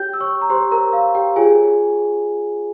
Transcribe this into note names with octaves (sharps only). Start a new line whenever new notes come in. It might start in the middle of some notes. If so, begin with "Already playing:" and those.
Already playing: G4 C#5 G5 G6
E6
C#5 C#6
A#5
G4 C5 C#5 C6
A#4 A#5
F5
G4 G5
F4 G#4 C#5 G#5